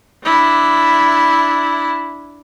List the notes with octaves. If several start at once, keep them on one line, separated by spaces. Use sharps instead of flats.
D4 E4